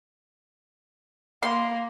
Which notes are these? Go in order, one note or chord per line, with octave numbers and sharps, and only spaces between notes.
A#3 C6